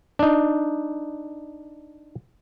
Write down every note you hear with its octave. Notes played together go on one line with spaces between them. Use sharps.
D4 D#4